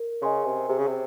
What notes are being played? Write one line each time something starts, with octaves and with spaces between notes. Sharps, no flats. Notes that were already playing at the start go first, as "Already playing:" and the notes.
Already playing: A#4
C#3 D#5 G#5 C6
C3
C3 G#4
C#3
C3